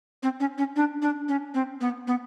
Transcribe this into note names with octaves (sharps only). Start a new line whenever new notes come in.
C4
C#4
C#4
D4
D4
C#4
C4
B3
B3